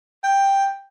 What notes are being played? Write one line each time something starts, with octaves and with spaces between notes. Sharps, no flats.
G5